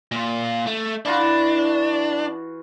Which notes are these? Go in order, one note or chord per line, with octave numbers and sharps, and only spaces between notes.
A#2 F4
A3
E3 D4 F4 F#4